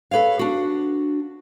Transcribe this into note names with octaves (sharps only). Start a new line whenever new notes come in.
A4 B4 C#5 F5
D4 F#4